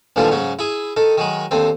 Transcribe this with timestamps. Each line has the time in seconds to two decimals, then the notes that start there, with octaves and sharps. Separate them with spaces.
0.16 A#1 D#2 D3 E3 F3 G3
0.31 G#2 C#3 F#3
0.59 E4 G#4
0.96 D#3 A4
1.18 D#3 F#3 G#3
1.51 D#2 D3 C4